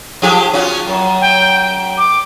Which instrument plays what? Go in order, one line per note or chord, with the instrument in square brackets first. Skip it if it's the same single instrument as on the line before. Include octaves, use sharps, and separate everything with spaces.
[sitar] F3 G4 G#4
C#4 F4 F#4
F#2
[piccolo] G5
D6